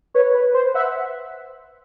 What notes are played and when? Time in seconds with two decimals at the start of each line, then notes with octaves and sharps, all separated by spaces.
0.14 B4 C#5
0.34 B4
0.54 C5
0.74 E5 F#5